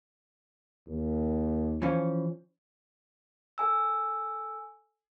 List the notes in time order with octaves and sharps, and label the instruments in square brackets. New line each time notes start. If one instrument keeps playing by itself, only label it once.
[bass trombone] D#2
[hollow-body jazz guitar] E3 F3 C#4
[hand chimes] A4 G#5 E6